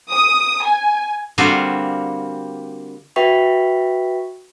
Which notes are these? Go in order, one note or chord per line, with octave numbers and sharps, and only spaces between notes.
D#6
G#5
D3 G3 A#3 C4 F4 F#4
F#4 B4 E5 G5 C#6 B6